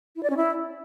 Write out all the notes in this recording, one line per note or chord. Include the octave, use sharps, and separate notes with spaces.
E4
D5
C#4
E4